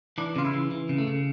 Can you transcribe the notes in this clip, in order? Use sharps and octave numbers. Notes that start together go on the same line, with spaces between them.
E3 D4
C#3 F4
E4
E3
E3
C#3
A3
C#3